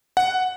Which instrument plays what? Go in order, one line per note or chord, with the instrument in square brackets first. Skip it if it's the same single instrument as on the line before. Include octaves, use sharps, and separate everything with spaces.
[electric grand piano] F#5